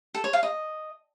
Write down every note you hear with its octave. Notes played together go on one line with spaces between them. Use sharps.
A4
C#5
F5
D#5